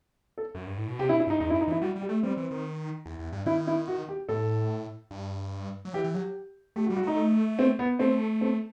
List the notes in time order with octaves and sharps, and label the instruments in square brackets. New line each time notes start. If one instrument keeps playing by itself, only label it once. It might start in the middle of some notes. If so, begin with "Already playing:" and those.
[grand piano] A4
[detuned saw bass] F#2
G2
A2
B2
[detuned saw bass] C3 [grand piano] G4
[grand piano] E4
[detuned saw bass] B2
[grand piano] E4
[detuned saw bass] G2 [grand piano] D#4
[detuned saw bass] E2 [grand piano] D#4
[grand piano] E4
[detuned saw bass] F#2
[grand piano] D#4
[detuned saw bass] E3 [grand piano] E4
[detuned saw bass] G3 [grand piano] F#4
[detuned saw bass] G3
[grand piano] G4
[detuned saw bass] A3
[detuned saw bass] G3 [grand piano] C4
[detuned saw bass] E3
D#3
E2
E2
G2
[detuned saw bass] D#3 [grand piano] E4
[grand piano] E4
F#4
G4
[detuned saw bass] A2 [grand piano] A4
[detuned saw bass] G2
F#3
[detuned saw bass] E3 [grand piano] G4
[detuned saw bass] E3
[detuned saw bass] F#3 [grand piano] G4
[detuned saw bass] A3 [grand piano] G4
[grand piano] F#4
[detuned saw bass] G3
[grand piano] F#4
[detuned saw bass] A3 [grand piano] D#4
[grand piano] C4
B3
[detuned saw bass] A3 [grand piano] C4
[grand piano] C4